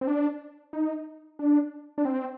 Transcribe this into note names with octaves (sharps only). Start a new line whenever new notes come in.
C4
D4
D#4
D4
D4
C4